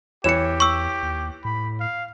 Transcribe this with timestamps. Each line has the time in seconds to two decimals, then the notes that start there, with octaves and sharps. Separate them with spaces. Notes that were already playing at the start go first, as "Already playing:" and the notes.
0.24 E2 E3 G4 C#5 C#7 E7
0.60 C#6 E6
1.02 D#2
1.45 A2 B5
1.80 F5